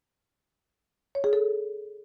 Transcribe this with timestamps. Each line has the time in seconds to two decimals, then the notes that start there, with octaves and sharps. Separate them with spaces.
1.15 C#5
1.24 G#4
1.33 A4